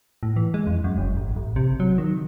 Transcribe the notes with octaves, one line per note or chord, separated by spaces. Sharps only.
A2
E3
G#3
F2
F#2
F#1
A1
A1
C3
F#3
D#3